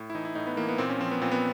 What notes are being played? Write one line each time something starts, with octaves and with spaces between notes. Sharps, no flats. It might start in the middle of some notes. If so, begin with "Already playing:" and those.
Already playing: A2
E4
E3 D#4
E4
A2 D#4
B3
E3 A#3
B3
A#2 C4
C#4
F3 C4
B3
A#2 C4
B3